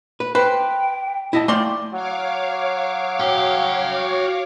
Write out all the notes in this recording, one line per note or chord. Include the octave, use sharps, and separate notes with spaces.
B4
B4 C5 G5
E4 D#5 A5
F3 A3 D5 G5 C6
F#3 C#5 F5 D6
F#4 G5